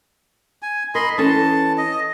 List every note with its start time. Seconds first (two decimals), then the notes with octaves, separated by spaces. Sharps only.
0.62 G#5
0.95 A#4 D#5 B5 C6
1.18 E3 C#4 A4 A5
1.77 D#5